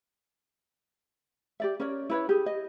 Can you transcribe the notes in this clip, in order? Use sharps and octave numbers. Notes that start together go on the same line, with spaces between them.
G4 D5 E5
C#4 A#4 C#5 D5
E4 B4 C#5
G4 G#4
D#5